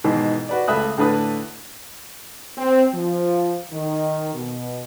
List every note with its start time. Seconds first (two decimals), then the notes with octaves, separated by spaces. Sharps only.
0.04 G#2 B2 D#3 E3
0.49 F#4 B4 D5
0.68 C#2 A3 E5 B5 D#6 F#6
0.98 A2 D3 A3 B4 D#6
2.58 C4
2.94 F3
3.71 D#3
4.34 B2